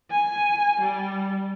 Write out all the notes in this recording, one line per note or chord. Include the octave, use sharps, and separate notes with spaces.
G#5
G3